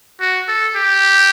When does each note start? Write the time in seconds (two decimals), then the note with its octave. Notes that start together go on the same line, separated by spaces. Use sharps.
0.21 F#4
0.48 A4
0.76 G4